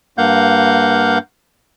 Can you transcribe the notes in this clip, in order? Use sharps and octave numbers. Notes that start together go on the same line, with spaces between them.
G2 A#3 F5 F#5 G6